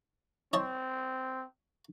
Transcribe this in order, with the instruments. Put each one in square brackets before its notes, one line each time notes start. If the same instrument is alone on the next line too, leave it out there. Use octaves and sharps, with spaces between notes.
[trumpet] C4 [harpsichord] C#5 D#5 A5